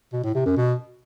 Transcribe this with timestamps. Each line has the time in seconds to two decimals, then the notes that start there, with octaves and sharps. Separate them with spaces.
0.13 B2
0.24 A2
0.35 C3
0.46 F#2
0.57 B2